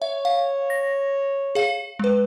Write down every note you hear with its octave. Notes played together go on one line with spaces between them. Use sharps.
C#5 E5
F5
A#6
G#4 F5
G#3 B4